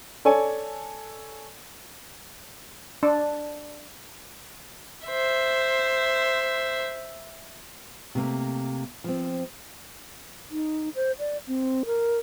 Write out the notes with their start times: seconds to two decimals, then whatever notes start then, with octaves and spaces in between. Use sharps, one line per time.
0.25 A4 C#5 D5 G#5
3.03 D4
5.07 C5 E5
8.15 C3 A3 A#3
9.04 F3 C4
10.51 D#4
10.95 C5
11.19 D5
11.47 C4
11.86 A#4